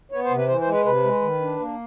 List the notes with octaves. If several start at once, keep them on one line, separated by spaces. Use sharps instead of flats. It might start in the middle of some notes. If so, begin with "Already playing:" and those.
B3 C#5
C5
C3
B4
E3 C5
C5
G#3
B4
C3 B4
G#3
D#3
D4
A#3